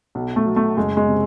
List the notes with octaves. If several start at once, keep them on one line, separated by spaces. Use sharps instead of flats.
B1
A3
F#3
A3
F#1 G#3
G#3
C3